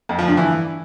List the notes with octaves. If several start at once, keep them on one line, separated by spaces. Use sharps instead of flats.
F2
F3
G2
E3